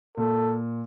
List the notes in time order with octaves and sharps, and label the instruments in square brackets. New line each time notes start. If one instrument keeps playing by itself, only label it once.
[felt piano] A#2 [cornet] A4